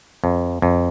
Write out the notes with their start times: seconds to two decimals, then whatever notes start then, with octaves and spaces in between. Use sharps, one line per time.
0.24 F2
0.62 F2